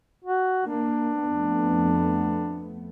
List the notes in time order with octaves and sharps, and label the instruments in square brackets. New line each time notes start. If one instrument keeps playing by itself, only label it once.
[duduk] F#4
[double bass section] A#3 [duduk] D4
[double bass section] F2 A3 B3